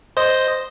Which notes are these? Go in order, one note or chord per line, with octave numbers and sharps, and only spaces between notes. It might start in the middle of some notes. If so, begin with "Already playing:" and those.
C5 D#5